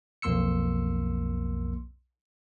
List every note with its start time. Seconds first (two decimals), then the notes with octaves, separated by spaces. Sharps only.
0.22 B1 F2 A#3 C6 E6 C#7